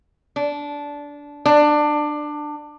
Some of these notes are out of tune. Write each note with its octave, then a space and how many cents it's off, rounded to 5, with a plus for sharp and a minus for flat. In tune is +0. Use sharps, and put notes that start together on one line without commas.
D4 -15
D4 +20